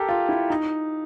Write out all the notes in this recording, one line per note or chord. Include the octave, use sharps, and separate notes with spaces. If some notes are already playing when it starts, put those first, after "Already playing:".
Already playing: G4 A4 A#4
F4
E4
D#4